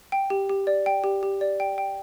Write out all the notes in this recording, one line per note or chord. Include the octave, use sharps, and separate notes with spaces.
G5
G4
G4
D5
G5
G4
G4
D5
G5
G5